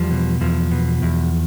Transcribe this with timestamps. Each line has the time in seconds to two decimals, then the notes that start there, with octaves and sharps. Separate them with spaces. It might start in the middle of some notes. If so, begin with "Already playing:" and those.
Already playing: E2 F3 G3
0.11 B2
0.41 E2 F3
0.71 B2
1.02 E2